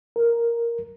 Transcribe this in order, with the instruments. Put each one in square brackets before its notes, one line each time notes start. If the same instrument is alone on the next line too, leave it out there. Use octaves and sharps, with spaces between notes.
[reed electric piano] A#4